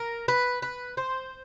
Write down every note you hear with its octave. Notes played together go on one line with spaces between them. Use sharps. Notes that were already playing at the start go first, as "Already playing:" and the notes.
Already playing: A#4
B4
B4
C5